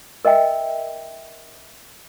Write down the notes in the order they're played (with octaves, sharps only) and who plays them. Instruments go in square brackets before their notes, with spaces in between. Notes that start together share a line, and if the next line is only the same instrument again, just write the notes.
[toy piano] A#4 D#5 E5 G5